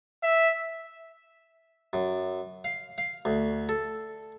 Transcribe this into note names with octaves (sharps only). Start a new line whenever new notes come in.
E5
F#2
F5
F5
D2
A4